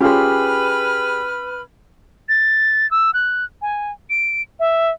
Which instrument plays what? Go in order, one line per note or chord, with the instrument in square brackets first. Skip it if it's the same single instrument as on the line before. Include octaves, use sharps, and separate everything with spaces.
[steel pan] C#4 F4 [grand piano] G4 G#4 [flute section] B4 B5 F6
[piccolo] A6
E6
F#6
G#5
D7
E5